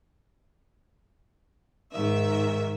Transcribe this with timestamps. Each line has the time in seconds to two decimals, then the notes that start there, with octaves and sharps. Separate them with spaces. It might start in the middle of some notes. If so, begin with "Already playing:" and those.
1.92 G#2 D#3 E5